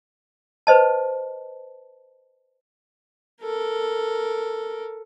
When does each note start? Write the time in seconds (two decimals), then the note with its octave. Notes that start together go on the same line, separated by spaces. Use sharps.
0.67 B4 C5 D#5 A5
3.42 A4 A#4